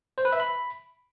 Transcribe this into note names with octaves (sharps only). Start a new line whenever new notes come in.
C5
B4
E5
B5